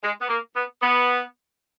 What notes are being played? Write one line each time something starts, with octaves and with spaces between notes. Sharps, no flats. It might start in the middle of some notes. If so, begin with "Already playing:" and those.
G#3
B3
A#3
B3
B3